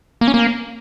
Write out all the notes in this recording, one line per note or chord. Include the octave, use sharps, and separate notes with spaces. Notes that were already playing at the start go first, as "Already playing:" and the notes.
A#3
C#4
A#3